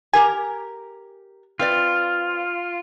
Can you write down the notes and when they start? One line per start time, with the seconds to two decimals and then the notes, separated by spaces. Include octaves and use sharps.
0.13 G4 A#4 G#5 A#5
1.59 C4 F4 B4 D5